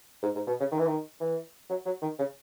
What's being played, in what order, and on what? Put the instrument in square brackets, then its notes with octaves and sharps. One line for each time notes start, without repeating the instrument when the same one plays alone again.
[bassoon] G#2
G#2
B2
C#3
D#3
E3
D#3
E3
F#3
F#3
D#3
C#3